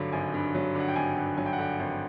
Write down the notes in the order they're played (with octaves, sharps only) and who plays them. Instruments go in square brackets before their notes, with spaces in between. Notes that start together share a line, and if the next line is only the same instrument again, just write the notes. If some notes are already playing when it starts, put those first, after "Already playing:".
Already playing: [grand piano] G#1 G2 D3 F#3
G#1 G#5
G2
F#3
D3
F#5
G5
G#1 G#5
G2
F#3 G#5
G5
F#5
D3 G5
G#1